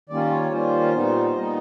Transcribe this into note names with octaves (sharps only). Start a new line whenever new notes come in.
D#3 G3 A#3 C#4 F4 D5
C#5
D#3 G3 A#3 C#4 F4 C5
A#2 G3 B3 D#4
A#2 G3 B3 D#4 D#5